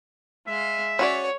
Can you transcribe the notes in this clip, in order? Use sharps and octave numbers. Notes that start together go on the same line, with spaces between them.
G#3 E5 F5
C#4 F#4 C#5 D5